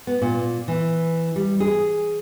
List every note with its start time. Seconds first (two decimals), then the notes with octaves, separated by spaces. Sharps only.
0.07 B3
0.22 A#2
0.68 E3
1.36 G3
1.60 G#4